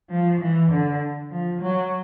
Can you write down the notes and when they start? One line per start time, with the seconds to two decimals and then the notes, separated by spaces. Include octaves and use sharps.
0.10 F3
0.41 E3
0.71 D3
1.31 F3
1.61 F#3